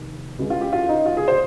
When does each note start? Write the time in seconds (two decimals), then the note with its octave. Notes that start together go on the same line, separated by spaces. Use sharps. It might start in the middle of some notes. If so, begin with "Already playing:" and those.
Already playing: F1 D#2
0.39 C#2 C#3 G#3
0.50 F4
0.61 G4
0.73 F4
0.89 D#4
1.06 F4
1.17 G#4
1.28 C5